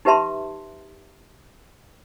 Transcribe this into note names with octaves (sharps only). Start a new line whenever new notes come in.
D#4 G4 B4 E5 A5 C6